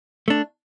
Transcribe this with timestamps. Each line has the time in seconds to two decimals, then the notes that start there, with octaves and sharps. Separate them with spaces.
0.28 A3 D4